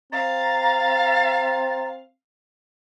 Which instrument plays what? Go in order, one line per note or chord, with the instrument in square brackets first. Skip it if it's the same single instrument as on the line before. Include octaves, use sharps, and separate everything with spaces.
[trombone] C4 [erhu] F5 [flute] A#5 [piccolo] A6